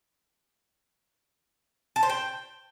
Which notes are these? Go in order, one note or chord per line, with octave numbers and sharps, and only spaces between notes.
A5
C5
G5